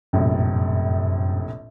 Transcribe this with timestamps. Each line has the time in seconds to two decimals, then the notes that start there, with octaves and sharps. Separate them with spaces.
0.13 F1 A#1 F#2 A2